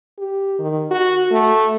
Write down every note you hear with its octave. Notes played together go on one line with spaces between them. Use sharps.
G4
D#3
F#4
A3